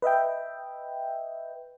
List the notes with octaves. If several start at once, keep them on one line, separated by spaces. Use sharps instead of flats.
B4 D#5 E5 G5